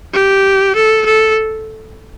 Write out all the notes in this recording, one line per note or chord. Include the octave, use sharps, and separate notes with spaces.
G4
A4
A4